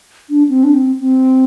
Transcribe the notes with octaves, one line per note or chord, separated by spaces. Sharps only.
D4
C4
D4
C4
C4